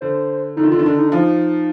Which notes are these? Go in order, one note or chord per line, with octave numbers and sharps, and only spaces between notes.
D3 C5
D3 D#4
D#3
D3 F4
D#3
D3 D4
D#4
D4
F3 D#4